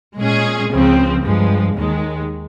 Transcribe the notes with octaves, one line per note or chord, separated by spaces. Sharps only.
A#2 G#3 C#4 G#4
C#2 C#3 F3 C4
G2 F3 G#3
D#2 D#3 G#3